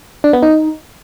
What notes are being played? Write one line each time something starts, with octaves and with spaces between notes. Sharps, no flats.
D4
B3
D#4